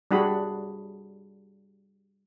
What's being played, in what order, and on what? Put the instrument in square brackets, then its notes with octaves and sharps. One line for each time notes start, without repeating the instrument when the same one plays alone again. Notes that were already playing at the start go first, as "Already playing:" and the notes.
[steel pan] G3 D4 F#4 G#4 B5